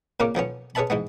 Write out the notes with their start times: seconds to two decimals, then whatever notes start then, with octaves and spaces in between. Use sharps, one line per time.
0.20 A#2 C#3 A#3 C#4 A#4 D6
0.35 B1 F3 B3 C#4
0.75 C#4 G#4 B4 E5 A5 B5
0.90 G#2 E3 G#3 B3